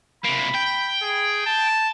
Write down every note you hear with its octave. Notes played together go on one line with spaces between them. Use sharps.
C3 A#3 B5
G5
G#4
A5